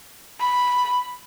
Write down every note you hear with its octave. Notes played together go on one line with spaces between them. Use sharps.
B5